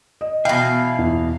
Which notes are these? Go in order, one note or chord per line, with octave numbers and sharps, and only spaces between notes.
D#5
B2 E3 F5 G5
E2